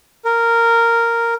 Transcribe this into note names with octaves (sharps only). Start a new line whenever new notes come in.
A#4